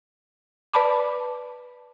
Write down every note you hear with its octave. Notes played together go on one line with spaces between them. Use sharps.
B4 D5 A5 B5 D6